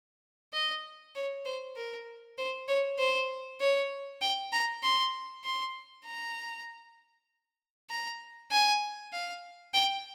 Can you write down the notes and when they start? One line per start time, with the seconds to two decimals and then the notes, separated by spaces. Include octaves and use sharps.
0.53 D#5
1.15 C#5
1.45 C5
1.76 A#4
2.38 C5
2.68 C#5
2.98 C5
3.60 C#5
4.21 G5
4.52 A#5
4.83 C6
5.44 C6
6.05 A#5
7.90 A#5
8.51 G#5
9.13 F5
9.74 G5